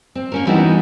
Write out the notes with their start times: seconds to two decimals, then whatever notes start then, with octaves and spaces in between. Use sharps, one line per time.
0.15 C4
0.32 A#3 C#4 A#4
0.47 E3 G3 B3 D#4 E4 F#4